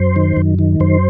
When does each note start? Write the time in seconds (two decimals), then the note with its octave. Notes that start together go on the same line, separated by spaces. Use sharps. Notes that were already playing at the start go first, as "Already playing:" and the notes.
Already playing: F#2 C5
0.16 D#3
0.37 F#2
0.59 D#3
0.80 F#2 C5